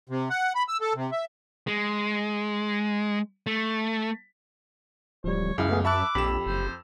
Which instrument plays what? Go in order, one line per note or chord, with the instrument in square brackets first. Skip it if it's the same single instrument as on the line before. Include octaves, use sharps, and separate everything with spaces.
[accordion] C3
F#5
B5
E6
A4
C3
E5
[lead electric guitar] G#3
A3
[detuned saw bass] D1 [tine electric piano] F3 G3 [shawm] C#5
[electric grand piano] C#2 [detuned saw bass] F#2 [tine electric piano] E4 G#4 [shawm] F5
[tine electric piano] A3 B3 G#4
[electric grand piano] E5 A5 E6 [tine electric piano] B5 F#6 [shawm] D6
[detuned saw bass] A#1 [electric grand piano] F2 E7 [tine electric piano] G4 B5
[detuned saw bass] F#1 [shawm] C5